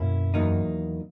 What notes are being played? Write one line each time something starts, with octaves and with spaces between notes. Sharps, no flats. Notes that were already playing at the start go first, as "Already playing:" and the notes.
Already playing: F#2 B2 A#3 C#4 E4
E2 D#3 F#3 A#3 D#4